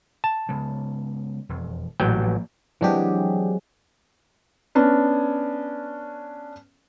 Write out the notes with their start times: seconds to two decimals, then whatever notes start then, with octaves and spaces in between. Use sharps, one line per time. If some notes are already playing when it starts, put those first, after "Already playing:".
0.24 A5
0.49 C#3 G#3 B3
1.49 E1 F2
2.00 A1 A#2 F#3 A#3 G5
2.22 F3 A#3
2.81 E3 F#3 G#3 C4 D4 G4
4.75 B3 C#4 D4